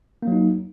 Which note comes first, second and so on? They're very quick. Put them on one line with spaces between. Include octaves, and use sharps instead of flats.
A#3 F#3 D#4